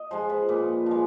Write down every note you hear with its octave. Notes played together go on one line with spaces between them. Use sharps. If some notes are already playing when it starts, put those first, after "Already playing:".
Already playing: D#5
F3 G#3 C5
B4
A#2 B4
F3 G#3